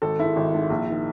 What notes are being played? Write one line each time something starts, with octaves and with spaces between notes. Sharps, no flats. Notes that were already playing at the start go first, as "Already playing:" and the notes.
G#1 A4
G#2 D#3 E4
G#1
G#2 D#3
A#1
D#3